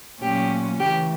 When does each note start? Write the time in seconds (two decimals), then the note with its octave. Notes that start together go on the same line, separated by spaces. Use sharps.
0.20 A#2 F#3 A3 C#4 G4
0.79 C#3 E3 A3 G4